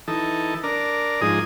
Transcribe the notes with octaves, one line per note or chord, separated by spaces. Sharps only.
E3 D#4 A4
D4 A#4
G#2 F3 D#4 G#4 D#6